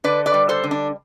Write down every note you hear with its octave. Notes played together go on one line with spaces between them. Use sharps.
D3 B4 D5
B4 D5
G3
A4 C5
D3
D4